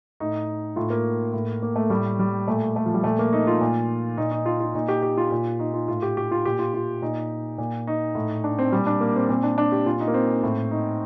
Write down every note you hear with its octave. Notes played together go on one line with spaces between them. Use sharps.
A2 D#4
A2 F4
A#3
A2
A#3
A3
A2 G3
G3
A#2 A3
A3
F3
G3
A#2 A3
A#3
D#4
F4
A#2
A#2 D#4
D#4
F4
F4
A#2 D#4
G4
G4
F4
A#2 F4
D#4
F4
A2 F4
G4
G4
F4
A#2 G4
F4
F4
A#2 D#4
A#2
D#4
A2
D4
C4
A#2 G3
D4
A#3
C4
A#2 C4
D4
D4
G4
A#2 F4
D#4
A#3
C4
A2
D#4